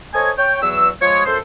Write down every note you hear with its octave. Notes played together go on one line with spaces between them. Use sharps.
A4 C5 C#5 D#5 G#5
C#5 G5
E2 F#3 E6
F3 G#3 C#5
F#2 A4 C5